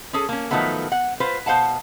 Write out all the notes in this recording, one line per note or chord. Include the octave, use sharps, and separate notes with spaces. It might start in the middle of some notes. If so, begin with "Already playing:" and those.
C#4 G#4 A4
A#3 C#4
D#3 F3 F#3 A3 B3
F#5
F4 B4 C5
B2 C5 F5 F#5 A5